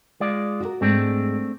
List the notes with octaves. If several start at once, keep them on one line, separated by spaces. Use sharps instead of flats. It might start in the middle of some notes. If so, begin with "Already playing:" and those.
G#3 F4 D5
F#4 G4 A#4
G#2 G#3 A3 C4 D4